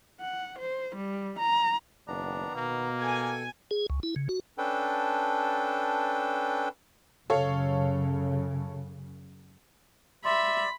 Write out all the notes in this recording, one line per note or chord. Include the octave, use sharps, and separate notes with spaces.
F#5
C5
G3
A#5
F#1 D#3 B3 D4 A#5
B2 A#3
A4 G5 G#5
G#4
C#2
E4
C#3
F#4
C#4 D4 A4 B4 G5
F#2 C#3 A4 C#5 F5
D5 E5 B5 C6